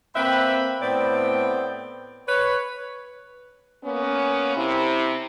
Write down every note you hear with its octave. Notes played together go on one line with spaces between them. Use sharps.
A#3 C4 B4 E5 G5 B5
A2 B3 C4 D5 G5
B4 C#5
A#3 B3 C#4
C3 E4